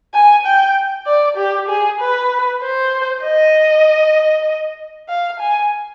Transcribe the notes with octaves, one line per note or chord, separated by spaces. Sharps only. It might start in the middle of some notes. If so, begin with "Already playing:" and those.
G#5
G5
D5
G4
G#4
B4
C5
D#5
F5
G#5